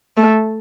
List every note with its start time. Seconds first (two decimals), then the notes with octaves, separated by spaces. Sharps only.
0.17 A3